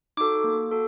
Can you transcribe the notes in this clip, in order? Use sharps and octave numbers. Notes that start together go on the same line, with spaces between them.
D#4 F#4 A4 D6
A#3
F#4 A4